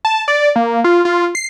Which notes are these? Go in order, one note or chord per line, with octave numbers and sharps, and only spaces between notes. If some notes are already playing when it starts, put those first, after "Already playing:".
A5
D5
A#3
F4
F4
C7